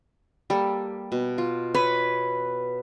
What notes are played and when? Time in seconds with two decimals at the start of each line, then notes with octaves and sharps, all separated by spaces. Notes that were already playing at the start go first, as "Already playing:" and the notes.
0.50 G3 A#3 A4
1.12 B2
1.38 F4
1.75 B4 C#5